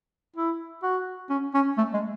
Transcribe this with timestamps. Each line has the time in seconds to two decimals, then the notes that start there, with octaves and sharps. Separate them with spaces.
0.36 E4
0.83 F#4
1.30 C#4
1.54 C#4
1.78 A3
1.94 G#3